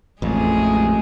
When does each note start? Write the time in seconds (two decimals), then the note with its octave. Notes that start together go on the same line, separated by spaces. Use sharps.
0.22 A1 F2 G#3 A3 G#4